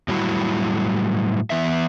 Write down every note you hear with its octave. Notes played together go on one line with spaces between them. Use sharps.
A2 F#3 G3 E4 F#4
E3 B3 E5